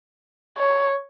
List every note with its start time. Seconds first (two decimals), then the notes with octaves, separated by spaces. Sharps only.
0.58 C#5